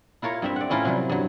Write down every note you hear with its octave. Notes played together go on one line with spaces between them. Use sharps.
E4 F4 A#4 C#5 A#5
G2 C4 E5
D5 F#5
A2 C#4 E4 F4 A#4
C3 F#3 G3
G2 F#3